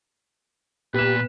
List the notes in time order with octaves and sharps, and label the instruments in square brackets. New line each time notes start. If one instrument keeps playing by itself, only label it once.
[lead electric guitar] A#2 [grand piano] B3 E7 [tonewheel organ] G4 [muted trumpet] B4